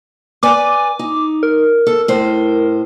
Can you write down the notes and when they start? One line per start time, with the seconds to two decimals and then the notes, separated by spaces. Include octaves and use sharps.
0.43 B4 D5 G#5 D6
0.99 D#4
1.43 A#4
1.87 A4
2.08 A2 C5